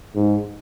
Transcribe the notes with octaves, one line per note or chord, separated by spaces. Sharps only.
G#2